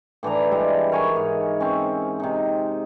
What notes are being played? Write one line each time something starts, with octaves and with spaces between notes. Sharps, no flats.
A2 E3 D4 A#5
G3 G#3 E4 A#5
A#4 C#5 G#5
G#2
C4 C#4
C3 D#4